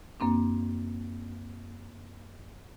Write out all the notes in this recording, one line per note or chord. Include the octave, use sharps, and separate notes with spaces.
F#2 A#3 C4 D4